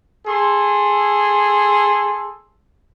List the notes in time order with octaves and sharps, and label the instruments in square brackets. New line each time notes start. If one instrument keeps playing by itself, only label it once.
[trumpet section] G#4 A4 C6